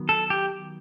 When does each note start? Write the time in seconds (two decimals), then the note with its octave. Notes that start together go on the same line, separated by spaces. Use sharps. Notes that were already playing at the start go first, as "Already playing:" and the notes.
Already playing: D#3 F#3 B3
0.09 A4
0.30 G4